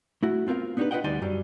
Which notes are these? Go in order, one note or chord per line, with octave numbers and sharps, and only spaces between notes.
A3 E4 F#4
B3 C4 F4 A#4 F5
B3 D4 D#4 F4 G4 B4
F4 B4 C5 D#5 F#5 G5
D2 G3 D#4 D5 G#5 C6
F#2 F#3 G3